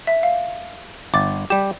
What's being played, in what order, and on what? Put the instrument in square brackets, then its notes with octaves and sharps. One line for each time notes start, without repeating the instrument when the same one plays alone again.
[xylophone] E5
F5
[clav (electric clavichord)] G1 [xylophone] D6 A6
[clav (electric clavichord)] G3 G4 [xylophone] E7